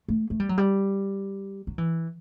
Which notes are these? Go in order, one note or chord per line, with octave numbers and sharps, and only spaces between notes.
A3
A3
G3
F#3
G3
F#3
E3